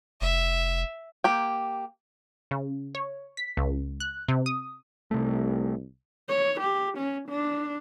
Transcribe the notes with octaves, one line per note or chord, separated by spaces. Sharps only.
F1 E5
A#3 G4 G5
C#3
C#5
B6
C#2
F#6
C3
D#6
C2 C3 A3
C#5
G4
C#4
D4